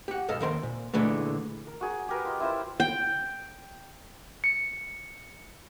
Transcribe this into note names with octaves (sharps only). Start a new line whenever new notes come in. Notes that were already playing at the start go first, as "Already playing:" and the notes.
G4 F#5
B1 G2 A4 D#5 F5
D#2 C4 A#4 C5 A#5 C6
A#2
A#2 D3 E3 G#3 A3
A#4
F#4 G#4 A#5
G4 A#4 B4
F4 D#5
E4 F4 A#4 C5
G5
C#7